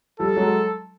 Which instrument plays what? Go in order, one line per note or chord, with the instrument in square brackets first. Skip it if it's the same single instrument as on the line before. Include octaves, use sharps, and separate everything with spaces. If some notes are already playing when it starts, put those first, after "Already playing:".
[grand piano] F3 G3 [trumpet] A4
[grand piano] F#3 G#3